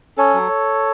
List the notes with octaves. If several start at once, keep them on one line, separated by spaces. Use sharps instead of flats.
C#4 A4 C#5
F#3